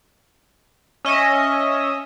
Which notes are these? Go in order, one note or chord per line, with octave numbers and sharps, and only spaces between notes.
C#4 D#5 E5